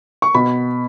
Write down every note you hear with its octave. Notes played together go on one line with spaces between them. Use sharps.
C#6
B2 B5